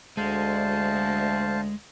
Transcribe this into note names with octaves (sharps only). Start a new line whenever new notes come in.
D2 G#3 C5 F5 A5